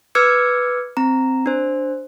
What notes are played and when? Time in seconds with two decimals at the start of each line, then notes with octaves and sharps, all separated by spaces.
0.15 B4 D6 E6 F6 G#6 C#7
0.97 C4 A#5
1.46 D4 C5